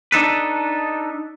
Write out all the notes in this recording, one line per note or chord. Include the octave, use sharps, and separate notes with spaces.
D4 D#4 A4 B4